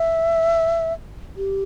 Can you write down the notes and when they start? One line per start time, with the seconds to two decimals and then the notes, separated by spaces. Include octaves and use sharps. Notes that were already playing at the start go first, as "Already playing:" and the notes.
Already playing: E5
1.37 G4